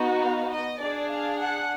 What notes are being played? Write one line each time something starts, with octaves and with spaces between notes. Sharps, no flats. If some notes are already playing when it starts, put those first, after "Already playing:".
Already playing: B3 D#4 F#4
F5
D#5
D4 G#4 D5
F5
F#5